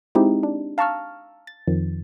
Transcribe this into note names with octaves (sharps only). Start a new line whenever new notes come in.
G#3 C4 D#4 E4 G4
D4
F5 A5 A#5 C#6 E6 F6
A6
F2 D#3 F3